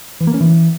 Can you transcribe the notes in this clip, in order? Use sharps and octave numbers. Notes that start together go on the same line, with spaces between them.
E3
A#3
C#4
E3